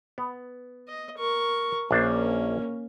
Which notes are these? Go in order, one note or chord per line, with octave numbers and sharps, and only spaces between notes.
B3
D#5
A#4 C#6
A#1 A#3 C#4 D4 C5